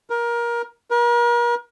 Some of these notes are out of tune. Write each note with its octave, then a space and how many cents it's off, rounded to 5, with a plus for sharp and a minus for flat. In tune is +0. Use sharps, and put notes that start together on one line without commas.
A#4 +20
A#4 +40